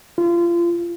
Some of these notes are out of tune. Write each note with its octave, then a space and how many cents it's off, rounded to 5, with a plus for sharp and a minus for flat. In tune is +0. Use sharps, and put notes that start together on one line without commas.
F4 -30